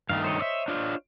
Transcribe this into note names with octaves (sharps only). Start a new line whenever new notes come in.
G2 D#3 A3 F5
C5 C#5 D#5
D5 E5
D4 F4